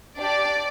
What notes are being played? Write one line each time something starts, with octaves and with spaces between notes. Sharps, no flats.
D4 G4 D5